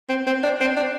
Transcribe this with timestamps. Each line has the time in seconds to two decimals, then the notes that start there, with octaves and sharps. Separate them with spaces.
0.09 C4
0.27 C4
0.44 D4
0.61 C4
0.77 D4